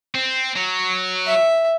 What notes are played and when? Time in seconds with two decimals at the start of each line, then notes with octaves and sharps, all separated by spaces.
0.15 C4
0.56 F#3
1.26 E5